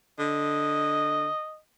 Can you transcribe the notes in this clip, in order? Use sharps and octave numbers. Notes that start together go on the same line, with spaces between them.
D3 D#5